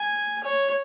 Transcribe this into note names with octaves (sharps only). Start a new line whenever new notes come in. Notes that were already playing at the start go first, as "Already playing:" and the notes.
Already playing: G#5
C#5